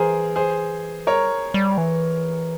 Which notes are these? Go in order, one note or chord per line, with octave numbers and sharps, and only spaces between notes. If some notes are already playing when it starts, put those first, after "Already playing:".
Already playing: E3 G#4 A#4 C5
G#4 C5
G3 A#4 C#5
G3
E3